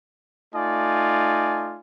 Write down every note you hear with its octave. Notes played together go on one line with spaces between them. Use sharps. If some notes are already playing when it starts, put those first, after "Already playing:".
A3 D#4 F4 D5 G#5